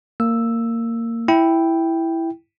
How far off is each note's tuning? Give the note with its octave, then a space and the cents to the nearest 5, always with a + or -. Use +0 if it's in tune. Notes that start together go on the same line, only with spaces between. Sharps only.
A#3 -20 E6 +0
E4 +0 G5 +0